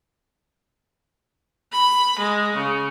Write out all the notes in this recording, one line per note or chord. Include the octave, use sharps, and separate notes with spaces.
B5
G#3
C#3